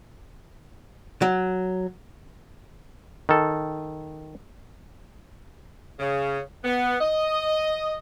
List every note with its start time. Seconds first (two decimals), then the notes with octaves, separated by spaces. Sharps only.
1.22 F#3
3.29 D#3 A4
6.00 C#3
6.65 B3
7.01 D#5